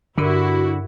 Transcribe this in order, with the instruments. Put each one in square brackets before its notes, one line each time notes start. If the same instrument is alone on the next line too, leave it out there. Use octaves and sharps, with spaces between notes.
[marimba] G2 A#4 [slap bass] D3 [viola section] E4 F#4